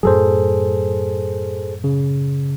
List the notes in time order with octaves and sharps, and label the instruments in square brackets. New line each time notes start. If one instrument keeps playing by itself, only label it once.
[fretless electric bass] F#2 A2 F#3 [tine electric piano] G#4 A4 C5
[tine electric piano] C#3